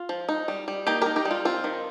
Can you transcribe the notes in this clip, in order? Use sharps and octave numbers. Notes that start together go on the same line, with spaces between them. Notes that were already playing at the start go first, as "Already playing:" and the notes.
Already playing: F4
F3
D#4
G3
G3
A#3 D#4 G4
D#4 G4 A#4
D#4 G4
G3
F4
C4 F4
D#3